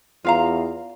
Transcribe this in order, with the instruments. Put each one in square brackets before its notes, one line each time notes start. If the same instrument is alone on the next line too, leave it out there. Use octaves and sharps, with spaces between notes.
[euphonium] E2 [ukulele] F4 F5 A#5